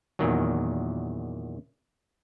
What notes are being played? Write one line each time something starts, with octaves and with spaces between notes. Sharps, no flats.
E2 A#2 D#3 F#3